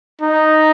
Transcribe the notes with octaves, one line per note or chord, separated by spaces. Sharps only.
D#4